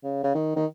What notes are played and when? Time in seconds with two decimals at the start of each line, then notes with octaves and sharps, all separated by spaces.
0.04 C#3
0.23 C#3
0.34 D#3
0.56 D#3